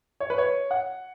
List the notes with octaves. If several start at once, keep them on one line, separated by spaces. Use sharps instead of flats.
C#5
B4
C#5
F#5